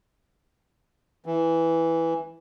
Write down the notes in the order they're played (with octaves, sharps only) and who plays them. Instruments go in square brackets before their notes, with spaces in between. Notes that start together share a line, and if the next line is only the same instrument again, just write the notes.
[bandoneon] E3